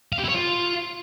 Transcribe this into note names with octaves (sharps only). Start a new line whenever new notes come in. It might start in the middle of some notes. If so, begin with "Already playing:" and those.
F5
G4
E4
C#5
F4